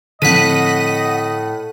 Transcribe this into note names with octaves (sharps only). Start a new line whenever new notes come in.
A2 D3 F3 C4 D#5 F#5 B6 D#7